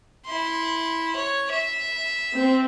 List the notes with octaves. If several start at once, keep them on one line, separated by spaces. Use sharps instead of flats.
E4 C6
C#5
E5
C4